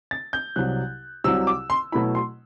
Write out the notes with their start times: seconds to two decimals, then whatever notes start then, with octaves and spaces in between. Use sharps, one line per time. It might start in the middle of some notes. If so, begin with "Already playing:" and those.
0.11 A6
0.33 G6
0.56 C2 C3 F#3 F#6
1.24 C2 C3 F#3 E6
1.47 D6
1.70 C6
1.92 B2 F#3 A3 E4 B5
2.15 C6